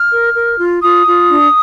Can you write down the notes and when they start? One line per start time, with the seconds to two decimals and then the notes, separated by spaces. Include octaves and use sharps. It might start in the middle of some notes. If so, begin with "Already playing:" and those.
Already playing: F6
0.11 A#4
0.35 A#4
0.58 F4
0.82 F4 D#6
1.06 F4
1.29 D4